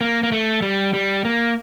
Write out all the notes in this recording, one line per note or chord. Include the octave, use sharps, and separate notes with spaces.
A#3
A#3
A3
G3
G3
A#3